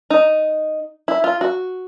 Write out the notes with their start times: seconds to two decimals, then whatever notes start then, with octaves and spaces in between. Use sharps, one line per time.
0.10 D#4
1.08 E4
1.24 F4
1.41 F#4